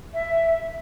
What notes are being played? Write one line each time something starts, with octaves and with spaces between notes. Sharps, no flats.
E5